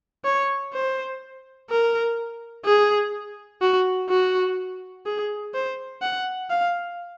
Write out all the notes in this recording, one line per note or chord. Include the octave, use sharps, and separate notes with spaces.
C#5
C5
A#4
G#4
F#4
F#4
G#4
C5
F#5
F5